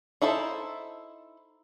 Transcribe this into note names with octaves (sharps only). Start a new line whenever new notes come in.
D#4 E4 A4 C5 A5